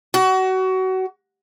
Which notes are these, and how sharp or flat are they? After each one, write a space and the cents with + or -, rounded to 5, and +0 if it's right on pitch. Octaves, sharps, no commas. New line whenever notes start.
F#4 +25